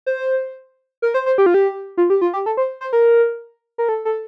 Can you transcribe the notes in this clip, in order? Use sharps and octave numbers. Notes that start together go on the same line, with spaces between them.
C5
A#4
C5
C5
G4
F4
G4
F4
G4
F4
G4
A4
C5
C5
A#4
A#4
A4
A4